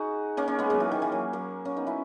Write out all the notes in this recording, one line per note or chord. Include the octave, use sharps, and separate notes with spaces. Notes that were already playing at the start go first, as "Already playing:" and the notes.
Already playing: D#4 F#4 G#4
A#3 C#4
A#3 C#4
G#3 B3
F#3 A#3
E3
D#3
E3
F#3
F#3 A#3
A#3 C#4
B3 D#4
C#4 E4